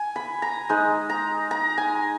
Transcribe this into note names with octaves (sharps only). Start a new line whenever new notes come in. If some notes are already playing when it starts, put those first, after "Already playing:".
Already playing: G#5
B5
A#5
G#3 D#4
A#5
A#5
G#5